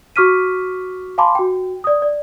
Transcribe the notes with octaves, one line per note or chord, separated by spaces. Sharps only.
F#4 C#6 D6 F6 B6 D#7
F5 G#5 A5 B5 C6 D6
F#4 G5
D5 D#6
D5